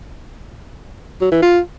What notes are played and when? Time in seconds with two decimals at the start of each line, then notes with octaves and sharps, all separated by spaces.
1.21 F#3
1.32 E3
1.42 F4